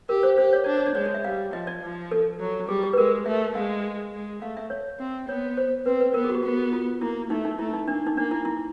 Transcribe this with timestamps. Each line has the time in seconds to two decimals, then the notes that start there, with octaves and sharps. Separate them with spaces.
0.09 G4 A#4
0.23 C5
0.38 G4 C5
0.53 C#5
0.64 D4 D5
0.77 C#5
0.86 D5
0.95 G#3 C#5
1.05 D5
1.14 E5
1.24 G3 F5
1.53 F3 D#5
1.67 D5
1.82 F3
2.11 A4
2.40 F#3
2.68 G3 G#4
2.83 G4
2.93 B4
2.98 G#3 A#4
3.26 A3 E5
3.55 G#3 F5
4.12 G#3
4.42 A3 F5
4.57 E5
4.70 C#5
4.99 C4
5.28 B3 C#5
5.57 C5
5.86 C4 B4
6.01 B4
6.14 B3 A#4
6.24 G#4
6.30 F#4
6.35 G4
6.43 B3 F#4
6.73 F4
7.01 A#3 E4
7.30 A3 D#4
7.45 D#4
7.59 A3 E4
7.74 D#4
7.88 A#3 D4
8.07 D#4
8.17 A#3 D4
8.31 E4
8.45 E4